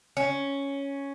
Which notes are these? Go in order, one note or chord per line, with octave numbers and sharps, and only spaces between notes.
C#4